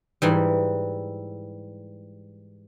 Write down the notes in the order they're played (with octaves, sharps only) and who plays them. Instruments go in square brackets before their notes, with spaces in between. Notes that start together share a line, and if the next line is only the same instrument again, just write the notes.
[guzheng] G#2 E3 G3